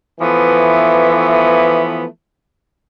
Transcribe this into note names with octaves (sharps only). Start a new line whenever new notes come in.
E3 F3 A3 B3